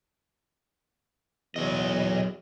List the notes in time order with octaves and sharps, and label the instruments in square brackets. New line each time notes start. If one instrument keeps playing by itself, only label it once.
[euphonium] E2 [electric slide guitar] F#3 D#5